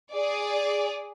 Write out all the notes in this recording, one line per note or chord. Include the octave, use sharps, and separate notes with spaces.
G#4 D5